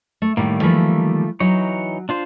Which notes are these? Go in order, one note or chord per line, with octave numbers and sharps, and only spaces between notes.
A3
A2 D#3 G3 A#3
E3 F3 A3
E3 F#3 D#4 C#5
D4 F4 C5